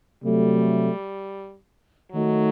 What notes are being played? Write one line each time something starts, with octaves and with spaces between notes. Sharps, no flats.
C3 F#3 G3 A3
D#3 F#3 A3 D#4 F#4